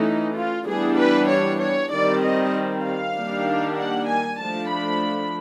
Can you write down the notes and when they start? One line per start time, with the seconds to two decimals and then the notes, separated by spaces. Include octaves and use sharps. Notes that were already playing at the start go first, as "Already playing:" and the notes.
Already playing: E3 A3 C#4 D#4
0.35 F4
0.66 E3 G3 B3 D4 G#4
0.97 B4
1.28 C#5
1.60 C#5
1.91 D#3 G3 C4 D5
2.21 D#5
2.84 F5
3.15 D#3 G3 A#3 D4
3.77 F#5
4.08 G#5
4.40 F3 A3 D4 A5
4.70 B5